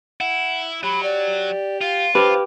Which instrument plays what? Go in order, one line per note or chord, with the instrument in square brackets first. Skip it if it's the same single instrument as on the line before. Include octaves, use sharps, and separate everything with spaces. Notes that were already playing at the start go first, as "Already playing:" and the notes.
[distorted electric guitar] E4 [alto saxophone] F#5
[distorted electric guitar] F#3 [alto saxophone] G4 [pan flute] B5
[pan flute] D5
[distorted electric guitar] F4 [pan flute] F5
[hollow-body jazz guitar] G4 B4 [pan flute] C5 [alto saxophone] F5